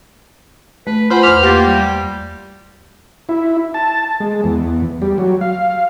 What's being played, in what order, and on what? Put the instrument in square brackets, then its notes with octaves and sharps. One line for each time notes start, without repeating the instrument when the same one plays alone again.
[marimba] A3 [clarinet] B4
[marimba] F4 F#5 G#5 [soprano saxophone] C5 [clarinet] B5
[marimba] E2 B4 D6 [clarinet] F6
[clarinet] A#3 [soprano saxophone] G4 [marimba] F#5 C6 A6
[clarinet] G3
[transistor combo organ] E4
A5
G#3
E2
G3
F#3
F5